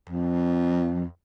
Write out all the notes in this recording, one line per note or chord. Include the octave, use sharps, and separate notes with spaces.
F2